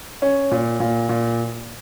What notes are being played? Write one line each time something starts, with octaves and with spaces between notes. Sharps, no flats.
C#4
A#2
A#2
A#2